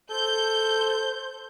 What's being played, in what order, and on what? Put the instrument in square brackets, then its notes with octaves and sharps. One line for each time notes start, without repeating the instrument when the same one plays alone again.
[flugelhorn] A4 [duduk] C5 [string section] G6